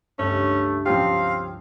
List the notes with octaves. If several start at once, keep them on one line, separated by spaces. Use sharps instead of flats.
C#2 G2 A3 C#4
F3 C4 C#4 G4 F5